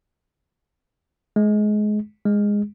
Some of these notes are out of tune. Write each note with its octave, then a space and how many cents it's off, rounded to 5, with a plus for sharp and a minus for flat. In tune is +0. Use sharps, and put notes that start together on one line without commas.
G#3 +25
G#3 -10